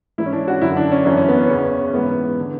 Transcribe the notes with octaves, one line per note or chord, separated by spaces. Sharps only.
G#2 E3 E4
C#4
D4
F#4
F#2 D3 E4
D4
C#4
F#2 E3 C#4
C#4
B3
C#4
E2 C#3 E3 C#4
G#2 E3 B3
D3